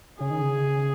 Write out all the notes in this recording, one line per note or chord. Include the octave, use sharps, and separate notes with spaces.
C#3 G#4
D#3
C#3